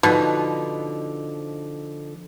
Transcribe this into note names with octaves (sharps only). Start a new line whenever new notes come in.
B2 D3 F3 D#4